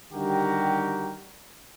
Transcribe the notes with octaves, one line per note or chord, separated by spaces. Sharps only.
D3 D#3 G3 F#4 G4 A#4